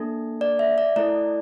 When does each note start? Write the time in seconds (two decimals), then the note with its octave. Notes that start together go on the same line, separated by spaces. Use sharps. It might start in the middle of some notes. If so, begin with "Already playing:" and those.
Already playing: A#3 D4 A4
0.41 D5
0.59 E5
0.78 D5
0.96 A3 E4 A4 D5